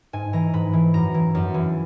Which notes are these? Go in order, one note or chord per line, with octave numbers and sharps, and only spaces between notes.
G#2 G#5
E3 A#5
G#2 B5
E3
F#2 A#5
E3
F#2
E3